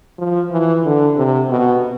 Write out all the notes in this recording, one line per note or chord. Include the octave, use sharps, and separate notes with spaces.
F3
E3
D3
C3
B2